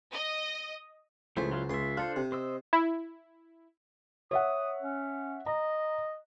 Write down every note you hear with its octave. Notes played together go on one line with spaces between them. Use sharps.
D#5
C#2 F3 A3 E4 C5
F#3 E4 F4
C#2 F4 E5 C6
D4 F4 A4 C5
C3
C5 D#5 E6
E4
C#5 E5 F#5 D#6
C#4
D#5 A#5